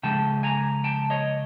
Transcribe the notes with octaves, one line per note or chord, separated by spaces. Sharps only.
C#3 F3 G#3 G5 A5
G#5 A#5
G5 A5
C#5 D#5